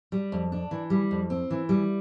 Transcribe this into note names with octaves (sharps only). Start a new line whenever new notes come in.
G3
F2
D4
E3
G3
F2
C4
E3
G3